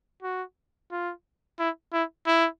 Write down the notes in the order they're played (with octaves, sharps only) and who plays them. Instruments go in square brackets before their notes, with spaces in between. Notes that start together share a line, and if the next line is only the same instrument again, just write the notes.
[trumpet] F#4
F4
E4
E4
E4